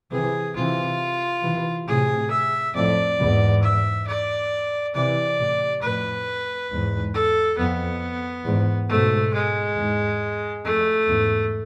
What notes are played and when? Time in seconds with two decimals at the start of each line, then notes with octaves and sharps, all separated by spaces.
0.11 C3 E3 G#4
0.56 C3 E3 F4
1.43 C3 E3
1.88 A2 C3 G#4
2.31 E5
2.75 F2 A2 D5
3.19 E2 G#2
3.63 E5
4.07 D5
4.94 C3 E3 D5
5.38 A2 C3
5.82 F2 A2 B4
6.70 E2 G#2
7.14 A4
7.58 F2 B3
8.45 E2 G#2
8.89 G#2 B2 A3
9.33 G#3
9.77 E2 G#2
10.65 F2 A3
11.08 E2 G#2